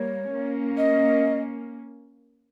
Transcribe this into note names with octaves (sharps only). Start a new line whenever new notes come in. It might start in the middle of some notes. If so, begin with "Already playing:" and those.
Already playing: G3 A#3 C#5
A#3 C#4
D#5